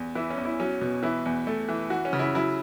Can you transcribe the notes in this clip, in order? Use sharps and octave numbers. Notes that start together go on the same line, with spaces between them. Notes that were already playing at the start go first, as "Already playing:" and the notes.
Already playing: E2
E3 E4
C#4
E2
E4
F#3 C#4
B2
E3 E4
E2
A3
E3
E3 F#4
C#4
C#3
E4
F#3 E4